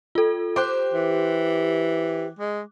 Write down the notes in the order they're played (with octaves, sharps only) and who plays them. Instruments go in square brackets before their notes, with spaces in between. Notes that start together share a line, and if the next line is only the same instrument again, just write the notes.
[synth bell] F4 A4
[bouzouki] G4 C5 [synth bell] D6 F#6
[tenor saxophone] E3
G#3